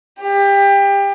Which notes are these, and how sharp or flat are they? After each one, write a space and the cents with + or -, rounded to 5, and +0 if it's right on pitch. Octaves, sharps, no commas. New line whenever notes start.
G4 +25